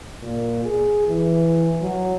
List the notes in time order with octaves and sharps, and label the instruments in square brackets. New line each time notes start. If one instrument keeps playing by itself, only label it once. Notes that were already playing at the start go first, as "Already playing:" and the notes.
[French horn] A#2
G#4
E3
F#3